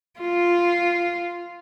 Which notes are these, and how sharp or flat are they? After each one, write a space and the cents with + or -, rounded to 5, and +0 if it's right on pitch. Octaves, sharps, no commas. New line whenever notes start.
F4 -5